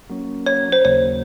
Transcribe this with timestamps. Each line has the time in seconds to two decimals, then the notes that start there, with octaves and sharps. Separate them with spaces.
0.09 F#3 A#3 C#4
0.46 C#5
0.72 C5
0.85 D#2 C#3 F#3 A#3 C#5